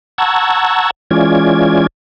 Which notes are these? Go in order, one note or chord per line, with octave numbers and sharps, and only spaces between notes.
F#5 A5 A#5 C#6 E6 G#6
E3 G#3 C#4 F4 D5 G#6